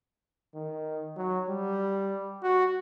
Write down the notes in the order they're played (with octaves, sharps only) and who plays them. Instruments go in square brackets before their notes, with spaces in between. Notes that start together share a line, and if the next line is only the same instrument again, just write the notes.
[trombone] D#3
F#3
G3
F#4